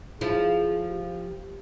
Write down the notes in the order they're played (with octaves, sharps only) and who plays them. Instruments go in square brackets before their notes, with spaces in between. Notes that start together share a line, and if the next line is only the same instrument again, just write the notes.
[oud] F3 E4 [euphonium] G#4
[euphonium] G4